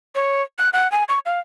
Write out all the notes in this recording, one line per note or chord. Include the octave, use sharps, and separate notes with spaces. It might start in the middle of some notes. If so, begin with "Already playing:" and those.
C#5
F#6
F#5
G#5
C#6
F5